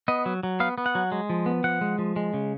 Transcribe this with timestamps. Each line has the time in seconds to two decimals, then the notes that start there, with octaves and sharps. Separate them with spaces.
0.08 B3 D#5
0.26 F#3
0.43 F#3
0.60 B3 F5
0.78 B3
0.86 F#5
0.95 F#3
1.12 G#3
1.30 F3
1.46 B3
1.64 F3 F#5
1.81 G#3
1.99 F3
2.16 G#3
2.34 C#3